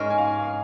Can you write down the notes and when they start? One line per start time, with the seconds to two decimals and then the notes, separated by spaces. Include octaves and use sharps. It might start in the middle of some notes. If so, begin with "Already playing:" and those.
Already playing: G#2 G#3 C#4 A#4 D#5
0.10 G#5
0.18 F5
0.43 F5